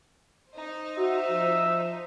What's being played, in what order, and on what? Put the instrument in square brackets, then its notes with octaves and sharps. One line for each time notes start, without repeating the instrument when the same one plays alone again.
[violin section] D#4 C5
[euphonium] F#4 [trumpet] E5
[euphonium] F3